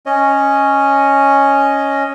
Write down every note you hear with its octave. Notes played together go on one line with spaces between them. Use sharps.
C#4 C#5 D#5